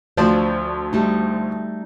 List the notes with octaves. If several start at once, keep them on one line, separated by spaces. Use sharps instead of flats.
D2 F3 C5 D5
G3 A3 D#4